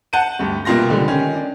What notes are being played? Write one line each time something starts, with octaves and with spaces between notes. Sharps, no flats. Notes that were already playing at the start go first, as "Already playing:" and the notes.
F#5 A5 G6 C#7 D#7
D2 G2 G4
C2 B2 A#3 F4 C6 A#6
C#2 D3 F3 G3
D#3 C#4
D4